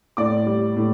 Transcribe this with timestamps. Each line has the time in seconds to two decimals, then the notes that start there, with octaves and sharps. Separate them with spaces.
0.17 A2 D5 D6
0.46 G3
0.76 A2